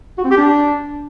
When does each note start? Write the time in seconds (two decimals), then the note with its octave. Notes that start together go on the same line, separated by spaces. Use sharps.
0.18 F#4
0.24 C4
0.31 G4
0.37 D4